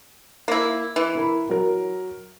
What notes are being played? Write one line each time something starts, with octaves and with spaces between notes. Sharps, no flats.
A#3 E4
E3
E4 A#4 B5
F#3 A#4